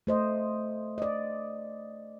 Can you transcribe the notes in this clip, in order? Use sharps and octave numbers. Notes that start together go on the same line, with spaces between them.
A3 C5 D#5
D5 D#5